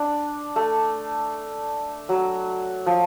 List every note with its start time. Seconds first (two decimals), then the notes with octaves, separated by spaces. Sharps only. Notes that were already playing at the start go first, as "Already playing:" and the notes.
Already playing: D4
0.56 A3
2.09 F#3
2.86 F3